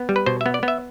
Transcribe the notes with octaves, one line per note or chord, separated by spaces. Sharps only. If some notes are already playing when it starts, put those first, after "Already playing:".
Already playing: B3
G3
B4
B2 C5
E5
B3
D5
B3
E5